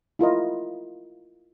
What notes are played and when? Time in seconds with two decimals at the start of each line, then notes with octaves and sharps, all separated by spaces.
0.19 E4 F4 A#4 D#5